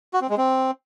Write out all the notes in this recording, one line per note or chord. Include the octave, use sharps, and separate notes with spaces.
F#4
C4
G#3
C4